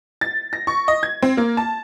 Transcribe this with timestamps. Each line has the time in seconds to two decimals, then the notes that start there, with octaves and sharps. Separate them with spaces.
0.21 A6
0.53 A#6
0.67 C#6
0.88 D#5
1.03 G#6
1.22 C4
1.37 A#3
1.57 A5